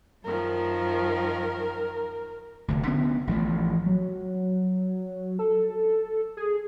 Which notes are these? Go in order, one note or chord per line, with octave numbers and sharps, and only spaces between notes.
F#2 D#3 F3 A#4
F1 D2
D3 B3 C#4
A1 F3 A3
F#3
A4
G#4